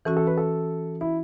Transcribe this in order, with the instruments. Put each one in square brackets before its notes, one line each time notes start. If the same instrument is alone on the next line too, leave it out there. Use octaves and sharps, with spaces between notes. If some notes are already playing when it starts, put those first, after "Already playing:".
[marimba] E3 C#4 F#4 [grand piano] A4
[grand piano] A4
B4
A4
E4